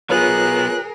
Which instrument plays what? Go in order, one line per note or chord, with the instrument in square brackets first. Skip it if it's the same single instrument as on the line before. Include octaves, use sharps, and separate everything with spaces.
[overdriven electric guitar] F#3 B3 [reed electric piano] F4 B4 C#5 [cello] G#4 A#4 [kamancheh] F#6